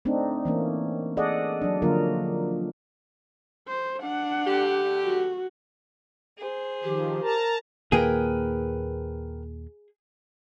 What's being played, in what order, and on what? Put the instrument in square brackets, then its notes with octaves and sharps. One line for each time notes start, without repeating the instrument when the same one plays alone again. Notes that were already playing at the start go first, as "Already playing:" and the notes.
[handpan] A3 C4 D4 D#4
E3 A#3 C#4
G#4 A4 D5 D#5 F#5
F#3 D4
D3 F3 F#3 A#3 F4 A#4
[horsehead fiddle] C5
D4 F#5
[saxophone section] D3 A3 G4
[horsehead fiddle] F#4
[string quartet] G#4 C5
[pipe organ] D#3 F3 [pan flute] G4
[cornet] A#4 [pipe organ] A5 A#5
[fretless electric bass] D#2 A#2 A#3 [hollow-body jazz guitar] G#4 [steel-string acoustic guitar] A#4 B4 G5